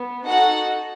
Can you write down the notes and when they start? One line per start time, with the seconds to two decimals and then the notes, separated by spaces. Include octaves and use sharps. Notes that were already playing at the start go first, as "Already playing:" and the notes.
Already playing: B3
0.26 D#4 F#4 A4 F#5